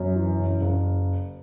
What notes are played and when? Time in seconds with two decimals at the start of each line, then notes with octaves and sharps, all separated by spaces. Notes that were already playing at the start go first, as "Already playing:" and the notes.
Already playing: F#2
0.16 E3
0.38 F#1
0.61 F#1